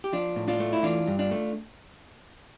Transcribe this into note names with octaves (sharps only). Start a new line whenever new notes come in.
G4
F3 D4 F4
A2
D4 F4
A3
E4
E3 D4 F4
G2
D4 F4
A3